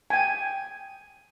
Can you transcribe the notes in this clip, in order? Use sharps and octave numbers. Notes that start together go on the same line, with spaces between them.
G5 G#5